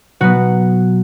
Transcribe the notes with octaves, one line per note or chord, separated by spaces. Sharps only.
B2 F#3 B3 F#4